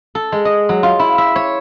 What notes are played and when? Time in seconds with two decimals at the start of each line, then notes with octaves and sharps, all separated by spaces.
0.15 A4
0.32 G#3
0.45 D#5
0.69 F#3
0.83 F4
0.99 E4
1.18 E5
1.36 C#5